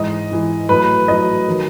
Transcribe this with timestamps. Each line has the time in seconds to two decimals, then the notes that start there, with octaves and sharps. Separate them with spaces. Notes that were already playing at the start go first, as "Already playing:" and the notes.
Already playing: G#2 E3 D#5
0.31 G#2 E3
0.69 A2 F#3 B4
1.08 A2 F#3 D#5
1.48 D#3 F#3